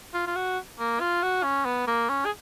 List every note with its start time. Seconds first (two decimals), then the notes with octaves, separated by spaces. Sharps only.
0.14 F4
0.27 F4
0.36 F#4
0.79 A#3
1.01 F4
1.23 F#4
1.44 C#4
1.65 B3
1.87 A#3
2.10 C#4
2.26 G#4